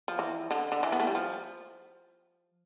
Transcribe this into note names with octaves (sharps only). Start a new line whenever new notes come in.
F3
E3
D3
D3
E3
B3
A3
G3
F3